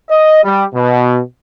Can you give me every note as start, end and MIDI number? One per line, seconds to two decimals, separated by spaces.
0.10 0.43 75
0.44 0.64 55
0.74 1.19 47